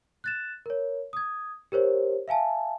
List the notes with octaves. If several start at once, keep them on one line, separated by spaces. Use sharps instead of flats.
F#6 A6 E7
A#4 C#5
D#6 G#6
G4 A#4 C5 C#5
E5 F5 G#5 A5